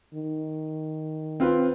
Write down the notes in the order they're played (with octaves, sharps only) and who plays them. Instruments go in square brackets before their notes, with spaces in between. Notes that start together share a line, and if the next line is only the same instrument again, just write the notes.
[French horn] D#3
[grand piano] C4 F4 B4